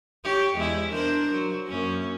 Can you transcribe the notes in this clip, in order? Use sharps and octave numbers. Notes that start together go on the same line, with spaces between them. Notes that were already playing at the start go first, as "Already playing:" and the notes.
G4 C#5
E2 G#3 E4
D4 A#4 C5
F#3
F#2 A#3 C#4